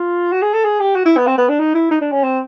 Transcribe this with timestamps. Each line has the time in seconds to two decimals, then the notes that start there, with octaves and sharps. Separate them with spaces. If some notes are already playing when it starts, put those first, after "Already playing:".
Already playing: F4
0.32 F#4
0.42 G#4
0.54 A4
0.64 G#4
0.80 G4
0.96 F#4
1.06 E4
1.17 B3
1.27 C4
1.38 B3
1.49 D4
1.60 D#4
1.75 E4
1.91 D#4
2.01 D4
2.12 C#4
2.23 C4